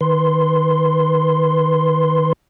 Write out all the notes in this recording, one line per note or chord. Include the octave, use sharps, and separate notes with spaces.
D#3 B4 C6